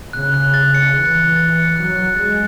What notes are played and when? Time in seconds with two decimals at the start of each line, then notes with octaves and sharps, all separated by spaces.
0.13 C#3 F#6
0.34 F#6
0.54 A6
0.74 C#7
0.94 E3 F#6
1.15 F#6
1.36 A6
1.56 C#7
1.76 F#3 F#6
1.97 F#6
2.16 G#3 A6